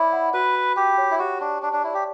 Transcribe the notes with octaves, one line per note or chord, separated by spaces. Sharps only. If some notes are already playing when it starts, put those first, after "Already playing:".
Already playing: E4 C#5 D5 B5 D6
F#5
F#4 B4
B5
G4 G5
C#5
E4
F#4 G4
D4 C#6
D4 A5
D4
E4 D5
G4